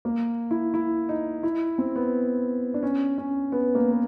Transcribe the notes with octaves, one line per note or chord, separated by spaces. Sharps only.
A#3
E4
E4
D#4
E4
C4
B3
D4
C#4
C#4
B3
A#3
B3